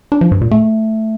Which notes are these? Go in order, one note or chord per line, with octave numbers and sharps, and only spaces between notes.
D4
F3
G2
A#2
A3